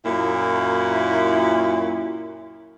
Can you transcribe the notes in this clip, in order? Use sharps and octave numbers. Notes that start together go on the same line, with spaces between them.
F#2 A#2 E4